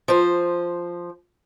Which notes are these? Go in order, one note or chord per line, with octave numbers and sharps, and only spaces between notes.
F3 C5